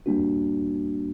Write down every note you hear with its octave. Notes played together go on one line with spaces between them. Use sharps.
G3 A#3 D4 F#4